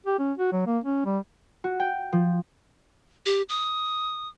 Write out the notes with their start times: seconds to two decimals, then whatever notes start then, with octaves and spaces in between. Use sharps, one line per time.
0.06 G4
0.19 C#4
0.38 F#4
0.52 F#3
0.66 A#3
0.84 C#4
1.05 G3
1.64 F#4
1.80 G5
2.13 F3
3.26 G4
3.49 D#6